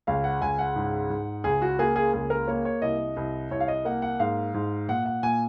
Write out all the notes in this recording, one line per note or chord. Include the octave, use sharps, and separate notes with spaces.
C#2 F5
F#5
C#2 G#5
F#5
G#2
G#2
C#2 G#4
F#4
A#3 G#4
G#4
C#2 G#4
A#4
A#3 C#5
C#5
C2 D#5
C2
C2 C#5
F5
D#5
A#3 F#5
F#5
G#2 F5
G#2
A#2 F#5
F#5
A#2 G#5